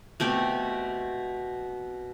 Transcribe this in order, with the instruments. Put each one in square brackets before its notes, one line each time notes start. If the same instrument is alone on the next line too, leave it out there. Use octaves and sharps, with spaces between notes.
[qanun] B2 A3 C4 G4